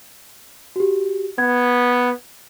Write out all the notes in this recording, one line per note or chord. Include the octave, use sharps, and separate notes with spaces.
F#4 G4
B3 G#6